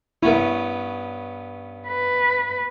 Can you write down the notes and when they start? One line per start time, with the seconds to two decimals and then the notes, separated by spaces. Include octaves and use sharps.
0.23 G2 B3 C#4 E4 A#4
1.88 B4